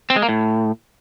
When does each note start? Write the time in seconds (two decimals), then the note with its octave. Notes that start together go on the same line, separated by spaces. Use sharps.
0.10 C4
0.16 G#3
0.22 A#3
0.29 A2